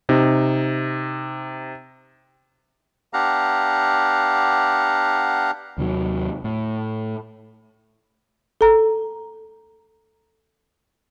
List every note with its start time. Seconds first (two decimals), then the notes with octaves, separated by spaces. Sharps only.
0.09 C3 D#4
3.13 B3 D4 G4 F5 F#5 A#5
5.78 D#2 C3 D#3 F#3
6.44 A2
8.61 A4 A#5